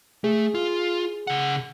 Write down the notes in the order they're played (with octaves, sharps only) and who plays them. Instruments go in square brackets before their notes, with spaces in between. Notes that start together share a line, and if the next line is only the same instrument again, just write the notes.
[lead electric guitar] A3 [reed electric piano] G#4
[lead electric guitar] F4
C#3 F#5